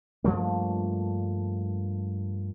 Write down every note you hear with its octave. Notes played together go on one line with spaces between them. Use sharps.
G2 F3 A3 A#3